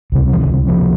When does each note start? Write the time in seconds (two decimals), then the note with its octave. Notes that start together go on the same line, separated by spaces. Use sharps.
0.12 C#2 C3
0.33 F3
0.40 D#3
0.68 F3